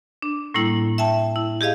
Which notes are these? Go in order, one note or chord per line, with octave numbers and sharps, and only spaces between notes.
D4
A2 G3 A#3 E4
E5 G5 A5
E4
G4 G#4 D#5 F5